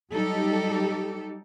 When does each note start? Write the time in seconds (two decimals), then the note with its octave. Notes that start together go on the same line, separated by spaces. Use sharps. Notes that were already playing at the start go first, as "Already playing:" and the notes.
0.14 F#3 G3 D#4 G4 A4